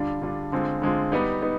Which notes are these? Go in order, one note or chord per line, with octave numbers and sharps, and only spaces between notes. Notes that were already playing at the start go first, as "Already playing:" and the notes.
Already playing: D3 G3 D4 F4
D3 G3 D4 F4
D3 G#3 C4 F4
D3 G#3 C4 F4
G3 B3 D#4
B3 D#4